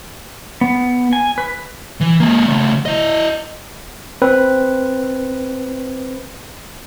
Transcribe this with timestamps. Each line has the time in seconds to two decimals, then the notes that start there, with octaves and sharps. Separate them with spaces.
0.61 B3
1.13 G#5
1.38 B4
2.01 E3
2.20 G#3 A#3
2.46 C#3 A3
2.86 E4 D#5
4.22 C4 B4